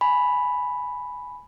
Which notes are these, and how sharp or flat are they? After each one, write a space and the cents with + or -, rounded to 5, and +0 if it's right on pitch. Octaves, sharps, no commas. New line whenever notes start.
G#5 +10 B5 +0